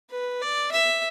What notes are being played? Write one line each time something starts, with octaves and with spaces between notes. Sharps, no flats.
B4
D5
E5